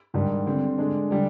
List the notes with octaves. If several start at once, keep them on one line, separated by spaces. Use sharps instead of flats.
G#2 D#3 G3 D4
D3 G3 C4
D3 G#3 D4
D3 G3 D4